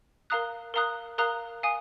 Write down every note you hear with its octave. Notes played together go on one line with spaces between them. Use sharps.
A#4 F5 A#5 D#6 F#6
A#4 F5 A#5 D#6 F#6
A#4 F5 A#5 D#6 F#6
F5 G#5 D#6